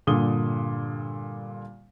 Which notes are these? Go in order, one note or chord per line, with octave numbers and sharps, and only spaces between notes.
G2 A#2 D3 D#6 G7